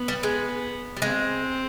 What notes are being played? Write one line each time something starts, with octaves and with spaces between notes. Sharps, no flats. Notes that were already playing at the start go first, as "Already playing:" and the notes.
Already playing: B3
G3
G#3
G3
G#3 C4